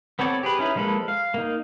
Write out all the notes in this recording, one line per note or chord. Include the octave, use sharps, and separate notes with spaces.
B3 C4 A4 C#5 D5
G4 G#4 B4
C#4 D#4 E4 B4
F3 G#3 A#3 A4 B4
F5
A#3 D#4